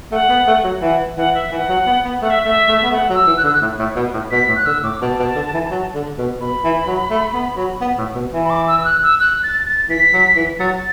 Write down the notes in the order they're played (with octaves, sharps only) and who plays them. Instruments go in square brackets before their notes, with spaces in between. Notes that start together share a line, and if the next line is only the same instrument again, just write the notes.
[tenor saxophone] A3 [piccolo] F#5
[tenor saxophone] B3
A3
F#3
[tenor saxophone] E3 [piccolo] F#5
[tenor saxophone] E3 [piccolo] F#5
[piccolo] E5
[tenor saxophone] E3 [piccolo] F#5
[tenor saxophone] F#3
B3
B3
[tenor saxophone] A3 [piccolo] F#5
[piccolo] E5
[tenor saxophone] A3
[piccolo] E5
[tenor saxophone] A3
B3
[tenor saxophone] A3 [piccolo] F#5
[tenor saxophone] F#3
[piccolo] E6
[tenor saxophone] E3
[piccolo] F#6
[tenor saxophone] D3 [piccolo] E6
[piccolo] F#6
[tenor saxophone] A2
A2
B2
A2
[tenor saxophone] B2 [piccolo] B6
[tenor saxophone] A2
[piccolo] F#6
[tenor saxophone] D3 [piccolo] E6
[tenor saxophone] A2 [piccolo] D6
[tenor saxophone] B2 [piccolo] A5
[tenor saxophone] B2
D3
E3
F#3
D3
B2
[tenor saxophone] B2 [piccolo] B5
[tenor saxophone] E3
F#3
A3
B3
F#3
B3
A2
B2
E3
[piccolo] B5
D6
E6
E6
F#6
E6
F#6
A6
A6
[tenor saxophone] E3 [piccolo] B6
[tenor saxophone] F#3
E3
[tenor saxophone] F#3 [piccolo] A6